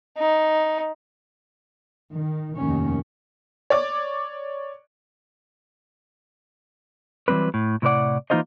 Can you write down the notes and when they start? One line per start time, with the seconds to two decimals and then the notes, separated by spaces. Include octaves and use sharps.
0.18 D#4
2.16 D#3
2.57 F1 D#2 D#3 C#4
3.70 C#5 D5 D6
7.28 E3 F#3 G3 C4 B4
7.54 A2
7.82 A2 C3 E4 B4 D5 F#5
8.30 E3 A#3 D#4 F4 C5 D#5